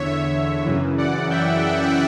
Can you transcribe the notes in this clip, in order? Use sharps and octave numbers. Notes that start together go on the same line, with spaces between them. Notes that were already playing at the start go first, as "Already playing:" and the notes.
Already playing: E2 D3 C#5 E5
F#2 C#3 E3
D5 F#5
E5 G5